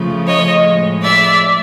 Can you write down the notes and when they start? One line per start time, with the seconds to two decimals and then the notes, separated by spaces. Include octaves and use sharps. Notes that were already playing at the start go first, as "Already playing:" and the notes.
Already playing: C#3 F3 A3
0.27 C#5 D#5
0.66 A2 F3 G#3
1.02 D5 E5